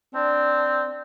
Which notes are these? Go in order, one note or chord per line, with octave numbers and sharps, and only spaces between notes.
C4 D4